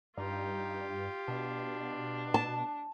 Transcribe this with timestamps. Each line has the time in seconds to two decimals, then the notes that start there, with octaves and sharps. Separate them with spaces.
0.17 G2 D#4 F4 G4
1.28 B2 D4
2.34 A5